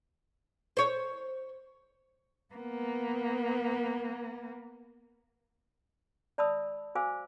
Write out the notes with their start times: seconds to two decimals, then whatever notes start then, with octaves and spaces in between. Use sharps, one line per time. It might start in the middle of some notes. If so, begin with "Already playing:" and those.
0.77 C5 C#5
2.54 A#3 B3
6.38 D5 E5 A5 B5 D#6 E6
6.95 F#4 C5 F5 G#5 D6 E6